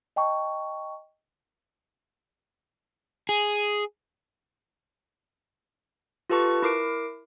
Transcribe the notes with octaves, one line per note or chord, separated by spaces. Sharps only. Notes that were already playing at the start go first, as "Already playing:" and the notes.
D#5 G5 A5 C#6
G#4
F4 G4 A4 B4 A5 C#6
E4 A#4 D6 C7 D7